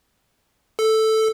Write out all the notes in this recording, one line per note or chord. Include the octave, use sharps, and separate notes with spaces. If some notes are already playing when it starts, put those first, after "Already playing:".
A4